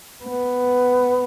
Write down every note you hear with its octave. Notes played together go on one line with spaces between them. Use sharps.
B3